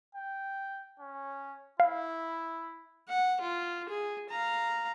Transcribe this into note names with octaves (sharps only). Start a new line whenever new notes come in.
G5
C#4
E4 F5
F#5
F4
G#4
F5 A#5